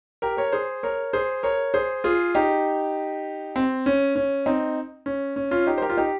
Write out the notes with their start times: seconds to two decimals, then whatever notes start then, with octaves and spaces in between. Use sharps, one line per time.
0.22 G4 A#4
0.37 A#4 C#5
0.52 G#4 C5
0.83 A#4 C#5
1.13 G#4 C5
1.43 A#4 C#5
1.74 G#4 C5
2.04 F4 G#4
2.35 D#4 G4
3.56 C4
3.86 C#4
4.16 C#4
4.46 C4 D#4
5.06 C#4
5.36 C#4
5.51 C#4 F4
5.67 D#4 G4
5.78 C5
5.82 G4 A#4
5.90 F4
5.97 D#4 G4